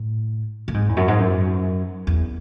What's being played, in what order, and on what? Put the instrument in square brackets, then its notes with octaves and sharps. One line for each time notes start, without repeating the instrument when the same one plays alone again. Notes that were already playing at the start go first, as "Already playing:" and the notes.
Already playing: [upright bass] A2
A2
G#2
E2
F#2
G#2
F#2
E2